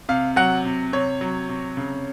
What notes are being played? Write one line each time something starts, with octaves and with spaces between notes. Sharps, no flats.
C3 F5
F#3 F#5
C3
C3 C#5
F#3
C3
C#3